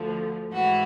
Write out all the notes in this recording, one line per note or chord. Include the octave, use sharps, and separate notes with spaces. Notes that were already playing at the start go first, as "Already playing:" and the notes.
Already playing: D2 D3 F3
G#2 E3 F#4